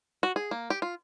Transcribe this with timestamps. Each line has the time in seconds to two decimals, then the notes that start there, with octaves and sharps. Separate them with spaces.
0.23 F#4
0.36 G#4
0.51 A#3
0.70 G4
0.82 F4